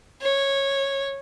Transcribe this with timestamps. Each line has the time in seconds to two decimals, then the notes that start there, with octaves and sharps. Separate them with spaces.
0.22 C#5